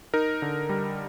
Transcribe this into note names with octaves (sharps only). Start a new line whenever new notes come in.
D#4 A#4
D3
G3